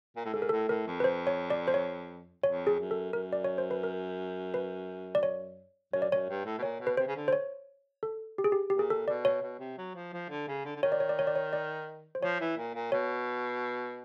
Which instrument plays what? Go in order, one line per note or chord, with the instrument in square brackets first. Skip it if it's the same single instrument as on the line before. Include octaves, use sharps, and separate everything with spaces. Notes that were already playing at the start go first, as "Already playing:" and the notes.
[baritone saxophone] A#2
A2
[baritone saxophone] G#2 [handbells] A4
[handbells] A#4
[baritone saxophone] A2 [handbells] A4
[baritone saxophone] A2 [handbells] A#4
[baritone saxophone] F2
[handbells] B4
C5
C#5
D5
C5
C#5
[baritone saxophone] F2 [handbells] C#5
[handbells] G#4
[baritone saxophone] F#2
[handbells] A4
[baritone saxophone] F#2 [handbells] A#4
[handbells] D5
C#5
C5
B4
A#4
B4
D5
C#5
[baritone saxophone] F#2 [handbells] C#5
[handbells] D5
[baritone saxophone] F#2 [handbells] C#5
[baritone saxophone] G2
A2
B2
[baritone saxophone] A#2 [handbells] C#5
[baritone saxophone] B2
[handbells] B4
[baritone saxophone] C3 [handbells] C5
[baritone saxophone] C#3
D3
[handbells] C5
C#5
A4
G4
G#4
G4
[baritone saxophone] A#2 [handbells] G4
[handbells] G#4
A4
[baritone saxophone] B2 [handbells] D5
[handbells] C#5
[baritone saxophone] B2
C3
F#3
F3
F3
D3
C#3
D3
D3
[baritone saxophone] D#3 [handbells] C#5
[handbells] D5
C#5
D5
C#5
D5
C#5
D5
C5
[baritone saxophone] F3 [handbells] C#5
[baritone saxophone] E3
A#2
A#2
[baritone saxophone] B2 [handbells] C#5